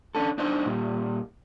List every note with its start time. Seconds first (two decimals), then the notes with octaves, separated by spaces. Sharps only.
0.15 C#4 D4 A4
0.38 D4 D#4 C5
0.66 A#2 G3